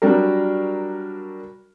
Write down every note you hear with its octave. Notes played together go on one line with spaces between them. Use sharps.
F#3 G3 D4 F#4 A#4